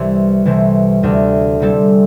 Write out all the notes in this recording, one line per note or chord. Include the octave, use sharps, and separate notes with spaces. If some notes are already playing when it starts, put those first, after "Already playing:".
Already playing: C2 C3 E3
C2 C3 E3 A3
D2 C3 A3 D4
C3 G3 C4 E4 A4